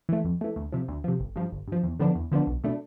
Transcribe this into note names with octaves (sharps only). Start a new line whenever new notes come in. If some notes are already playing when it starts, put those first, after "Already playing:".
E3 A3
F2
E3 A3
D2
C3 F3
D2
C3 F3
G1
G2 F3
G1
G2 F3
E2
D3 F3 B3 D4
E2
D3 F3 B3 D4
B1
B2 A3 D4